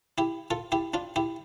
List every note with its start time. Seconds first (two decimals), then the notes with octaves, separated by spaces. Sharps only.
0.18 E4 G4
0.51 F4 A4
0.72 E4 G4
0.94 D4 F4
1.16 E4 G4